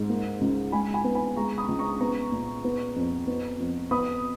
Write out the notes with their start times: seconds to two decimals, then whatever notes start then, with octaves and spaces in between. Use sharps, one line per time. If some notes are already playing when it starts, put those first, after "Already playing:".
Already playing: G#2
0.10 A#3
0.41 C#2
0.72 G#3 G#5 B5
0.94 G#5 B5
1.04 B3
1.15 G#5 B5
1.36 G#3 A#5 C#6
1.58 B5 D#6
1.68 C#2
1.79 A#5 C#6
2.00 B3 A#5 C#6
2.32 A#2
2.64 B3
2.96 F2
3.27 B3
3.60 F2
3.91 B3 B5 D#6